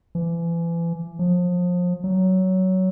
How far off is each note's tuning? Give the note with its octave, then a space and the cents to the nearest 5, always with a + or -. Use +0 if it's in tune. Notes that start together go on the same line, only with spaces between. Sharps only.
E3 +35
F3 +30
F#3 +15